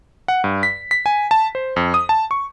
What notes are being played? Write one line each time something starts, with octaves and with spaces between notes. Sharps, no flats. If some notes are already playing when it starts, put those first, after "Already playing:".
F#5
G2
B6
B6
G#5
A5
C5
F2
D#6
A5
C#6